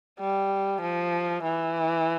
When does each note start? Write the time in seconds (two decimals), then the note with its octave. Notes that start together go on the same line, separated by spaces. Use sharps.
0.20 G3
0.82 F3
1.44 E3